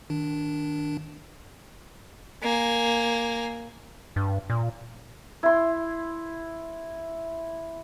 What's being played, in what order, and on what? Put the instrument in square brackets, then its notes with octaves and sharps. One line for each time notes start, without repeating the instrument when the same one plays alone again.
[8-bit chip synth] D#3 D4
[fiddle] A#3 G#5
[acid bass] G2
A#2
[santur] E4 C6